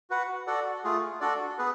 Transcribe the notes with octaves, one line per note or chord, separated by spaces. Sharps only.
F#4 B4 F#5
F#4 A4 D5 F#5
A3 F4 G#4
D4 F#4 A4 D5
B3 G#4 B4